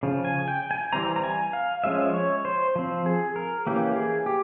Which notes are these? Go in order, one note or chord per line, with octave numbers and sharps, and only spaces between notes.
C#3 F3
G#5
G5
G#5
E3 G3 C4 A#5
A#5
G#5
F5
F3 G#3 C#4 E5
C#5
C5
F3 C4
G#4
A#4
E3 A#3 C#4 G4
G#4
G4